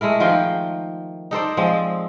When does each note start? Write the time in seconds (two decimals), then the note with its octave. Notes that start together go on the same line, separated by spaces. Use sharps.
0.01 G#3 A3 E4 A#4
0.20 D#3 F3 F4 G5
1.31 D#4 A4 C5 D5
1.57 F3 G#3 C4